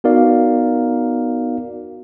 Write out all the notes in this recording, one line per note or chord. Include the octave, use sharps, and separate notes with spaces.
B3 D#4 F#4 A#4 D5 F5